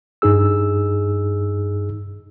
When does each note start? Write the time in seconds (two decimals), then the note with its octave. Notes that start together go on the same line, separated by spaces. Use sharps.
0.22 G2 D#4 G#4 E6